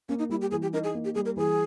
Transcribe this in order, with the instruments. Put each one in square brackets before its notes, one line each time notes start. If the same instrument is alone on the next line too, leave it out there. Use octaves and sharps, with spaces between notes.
[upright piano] A#3 [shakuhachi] C#4
[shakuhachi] D#4
[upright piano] G3 [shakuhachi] E4
[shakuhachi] G4
[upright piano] E3 [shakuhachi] G#4
[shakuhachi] G4
[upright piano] D#4 [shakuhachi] A#4
[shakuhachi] G#4
[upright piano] A#3
[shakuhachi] G4
[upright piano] G3 [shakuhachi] G#4
[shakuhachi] A#4
[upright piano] E3 [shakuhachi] G#4